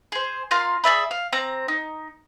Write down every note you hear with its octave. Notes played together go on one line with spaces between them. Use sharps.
G#4 C5
F4 A#4 F5 C6
G#4 D5 E5 B5
F5
C4 A#5
D#4